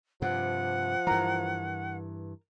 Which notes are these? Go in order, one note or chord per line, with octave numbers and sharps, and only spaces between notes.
G2 C3 F3 F#5
G2 E3 A#4